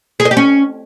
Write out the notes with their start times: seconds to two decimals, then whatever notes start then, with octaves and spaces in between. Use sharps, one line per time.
0.20 G#4
0.25 D#5
0.31 G4
0.37 C#4